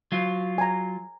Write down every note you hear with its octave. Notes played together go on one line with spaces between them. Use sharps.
F#3 F4
G#5 A#5